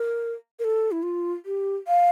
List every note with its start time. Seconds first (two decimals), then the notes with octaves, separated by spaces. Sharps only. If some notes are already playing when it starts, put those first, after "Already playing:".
Already playing: A#4
0.59 A#4
0.64 A4
0.92 E4
1.03 F4
1.46 G4
1.88 F5